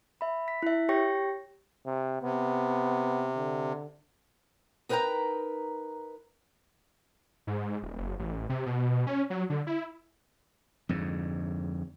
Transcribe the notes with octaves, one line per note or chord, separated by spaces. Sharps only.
E5 B5
B6
E4 E5
G4 C#5 G5 C#6 A#6
C3
C3 B3
D3
D#4 A#4 B4 D#5 G5 A#5
G#2
D#1
F#1
A1
C3
B2
C#4
F#3
D3
E4
F2 G#2 D3